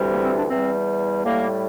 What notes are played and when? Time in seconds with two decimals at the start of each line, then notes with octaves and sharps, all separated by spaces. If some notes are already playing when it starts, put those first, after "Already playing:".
Already playing: D2 C3 E3 G3
0.12 A#3
0.24 C4
0.37 D4
0.49 E2 E3 G3 C4
1.24 A2 G3 A#3